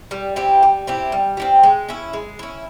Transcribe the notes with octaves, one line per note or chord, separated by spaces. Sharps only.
G3
C4 E4 G4
G3
C4 E4 G4
G3
C4 E4 G4
G#3
C#4 E4
G#3
C#4 E4